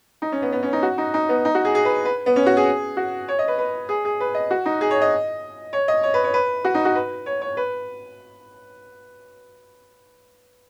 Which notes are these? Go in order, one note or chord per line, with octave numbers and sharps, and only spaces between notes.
D#4
C#4
B3
B3
C#4
D#4
F#4
D#4
D#4
B3
D#4
F#4
G#4
G#4
B4
B4
B3
C#4
F#4
G#4
F#4
C#5
D#5
B4
B4
G#4
G#4
B4
D#5
F#4
D#4
G#4
C#5
D#5
C#5
D#5
C#5
B4
C#5
B4
F#4
D#4
F#4
B4
C#5
C#5
B4